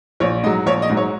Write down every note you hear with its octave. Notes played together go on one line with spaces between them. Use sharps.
A#1 C#5
G#2 F#3 D#5
A#1 C#5
D#5
G#2 F#3
C#5